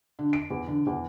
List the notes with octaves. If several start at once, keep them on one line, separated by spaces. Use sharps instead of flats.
D3
D7
E2
D3
E2